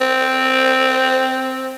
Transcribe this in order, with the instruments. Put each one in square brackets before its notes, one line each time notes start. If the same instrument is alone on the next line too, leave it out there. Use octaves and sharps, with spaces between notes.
[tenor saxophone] C4